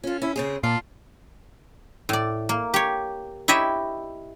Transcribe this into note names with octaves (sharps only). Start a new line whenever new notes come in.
C#4 F4 A4
C#4 E4
C#3 C4 G#4 C#5
A#2 F4 D5 A5
A2 D5
A#3
G4 C#5
E4 G4 C#5 D#5 E5